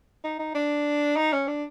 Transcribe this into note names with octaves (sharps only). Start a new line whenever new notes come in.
D#4
D#4
D4
D#4
C#4
D4